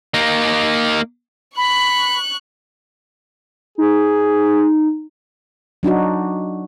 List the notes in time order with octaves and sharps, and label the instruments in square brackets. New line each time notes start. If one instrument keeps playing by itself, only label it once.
[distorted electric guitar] A#3 D#4
[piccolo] B5 [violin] C#6 F#6
[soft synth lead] D#4 [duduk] G#4
[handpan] F#3 D4 D#4 F#4